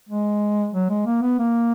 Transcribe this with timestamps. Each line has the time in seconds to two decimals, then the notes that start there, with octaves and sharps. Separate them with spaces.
0.09 G#3
0.74 F#3
0.90 G#3
1.06 A#3
1.22 B3
1.39 A#3